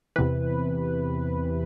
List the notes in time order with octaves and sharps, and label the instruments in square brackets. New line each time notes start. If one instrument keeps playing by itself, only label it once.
[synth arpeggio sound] E2 C3 E3 B4